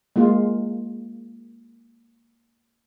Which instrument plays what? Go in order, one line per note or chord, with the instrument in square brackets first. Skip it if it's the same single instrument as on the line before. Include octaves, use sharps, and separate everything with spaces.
[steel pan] G#3 A#3 F4